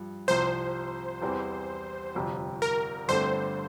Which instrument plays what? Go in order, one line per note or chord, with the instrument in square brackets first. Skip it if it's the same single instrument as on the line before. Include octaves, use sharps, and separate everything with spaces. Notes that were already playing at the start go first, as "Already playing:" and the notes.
Already playing: [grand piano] G2 F3
[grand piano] C2 C3 F3 [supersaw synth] C5
[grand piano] E2 E3 G3 C4
G1 F2 C3
[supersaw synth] A#4
[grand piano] G1 G2 D3 A3 C4 [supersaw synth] C5